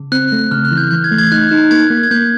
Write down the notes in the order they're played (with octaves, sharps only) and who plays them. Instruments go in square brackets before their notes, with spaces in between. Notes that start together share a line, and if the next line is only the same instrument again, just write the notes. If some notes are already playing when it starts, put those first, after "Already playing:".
Already playing: [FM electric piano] C#3
[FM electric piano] C4 [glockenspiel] F#6
[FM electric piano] A3
[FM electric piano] C#3 [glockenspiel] F6
[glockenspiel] F#6
[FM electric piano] E3
[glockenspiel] G6
[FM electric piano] E3 [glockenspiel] G6
[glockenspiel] G#6
[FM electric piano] A3
[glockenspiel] G#6
[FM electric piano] D#4 [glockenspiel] F#6
[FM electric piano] D#4
[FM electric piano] A#3 [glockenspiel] G#6
[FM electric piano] A#3
[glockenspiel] G#6
[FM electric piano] A#3 [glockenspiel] G6